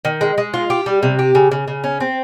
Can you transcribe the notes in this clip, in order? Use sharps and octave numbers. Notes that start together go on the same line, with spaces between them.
D#3
G#3
G#3
F4
G4
G3
C3
G4
C#3
C#3
C#3
C#4
C4